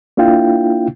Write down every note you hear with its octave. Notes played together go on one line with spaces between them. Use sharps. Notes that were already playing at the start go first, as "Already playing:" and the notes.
A#3 D4 E4 F4 G5